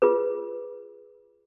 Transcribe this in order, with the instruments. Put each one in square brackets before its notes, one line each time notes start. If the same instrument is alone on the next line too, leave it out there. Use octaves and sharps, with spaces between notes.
[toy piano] F4 G#4 B4